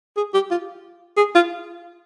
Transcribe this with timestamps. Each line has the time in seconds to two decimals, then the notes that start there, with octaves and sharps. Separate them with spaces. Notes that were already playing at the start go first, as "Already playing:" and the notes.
0.17 G#4
0.34 G4
0.51 F4
1.17 G#4
1.35 F4